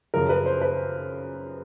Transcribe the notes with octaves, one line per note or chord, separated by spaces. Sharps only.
F#2 C#3 F3 A#4
B4
C5
B4